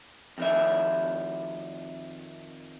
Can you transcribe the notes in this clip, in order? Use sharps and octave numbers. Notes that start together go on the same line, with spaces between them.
F2 D#3 E5